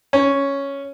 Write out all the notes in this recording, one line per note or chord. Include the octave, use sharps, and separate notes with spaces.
C#4